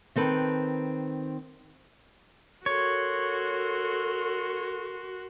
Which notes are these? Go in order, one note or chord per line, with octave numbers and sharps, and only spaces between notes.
D#3 C4 A4 B4
F#4 A4 A#4 C#5 C6